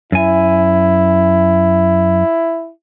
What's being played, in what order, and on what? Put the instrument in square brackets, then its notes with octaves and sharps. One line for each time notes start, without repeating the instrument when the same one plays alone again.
[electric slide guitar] F#2 G#5 [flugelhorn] E4